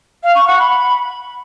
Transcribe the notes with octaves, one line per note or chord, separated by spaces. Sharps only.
F5
C#6
F#5
B5